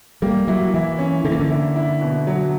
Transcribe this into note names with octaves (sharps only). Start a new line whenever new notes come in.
G3 A#3
F#3 E4
E3 E4
C#4
D3 A#3
E3
D3
E4
E4
B2
F#3